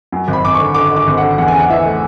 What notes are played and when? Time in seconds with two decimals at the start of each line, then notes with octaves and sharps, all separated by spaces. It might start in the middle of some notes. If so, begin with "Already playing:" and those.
0.12 F#2
0.28 G#1
0.33 B5
0.44 G#1 D6
0.55 D3 C#6
0.74 D3 D6
0.90 D3
0.96 D6
1.07 G#1
1.18 D3 F#5
1.38 E2 F#5
1.48 G#5
1.54 C#3
1.59 F#5
1.70 E3 E5
1.85 A3